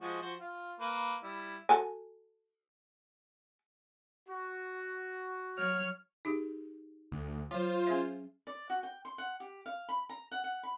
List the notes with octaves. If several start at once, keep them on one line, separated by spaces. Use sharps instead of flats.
F3 G#3 F#4
F3 F#4 C5
F4
A#3 B4
G3 E4
F#4 A4 G#5
F#4
F#3 C#5 F6
D#4 G4 G#4
D2
F#3 F4 C5
C#4 G#4 E5
D5
F#4
G5
C6
F#5
G4
F5
B5
A#5
F#5
F#5
B5